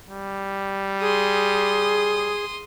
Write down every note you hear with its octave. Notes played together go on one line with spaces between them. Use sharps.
G3
G#4 C6 D#6